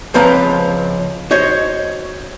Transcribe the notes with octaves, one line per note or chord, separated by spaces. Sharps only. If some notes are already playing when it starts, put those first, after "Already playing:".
C#2 F3 C4 B4 F5 A#5
F#4 C5 C#5 D#5